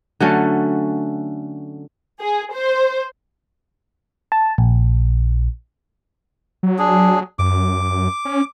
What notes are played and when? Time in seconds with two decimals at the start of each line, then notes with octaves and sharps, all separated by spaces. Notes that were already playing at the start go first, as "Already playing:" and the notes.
0.20 D3 F#3 A3 C#4
2.20 G#4
2.53 C5
4.32 A5
4.58 A#1
6.63 F#3
6.79 D4 G#4
7.39 F#2 D6
8.25 C#4